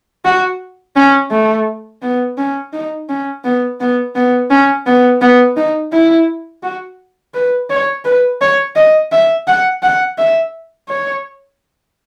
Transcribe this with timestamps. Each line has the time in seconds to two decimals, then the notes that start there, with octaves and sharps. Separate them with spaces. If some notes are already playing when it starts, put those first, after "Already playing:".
0.25 F#4
0.96 C#4
1.31 A3
2.02 B3
2.38 C#4
2.73 D#4
3.09 C#4
3.44 B3
3.80 B3
4.15 B3
4.50 C#4
4.86 B3
5.21 B3
5.56 D#4
5.93 E4
6.63 F#4
7.34 B4
7.70 C#5
8.05 B4
8.41 C#5
8.76 D#5
9.12 E5
9.47 F#5
9.83 F#5
10.18 E5
10.89 C#5